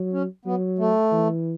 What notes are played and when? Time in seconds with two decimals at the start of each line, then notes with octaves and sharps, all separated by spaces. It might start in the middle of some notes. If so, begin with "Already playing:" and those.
Already playing: F#3
0.13 C#4
0.45 F#3 B3
0.79 A3
1.12 E3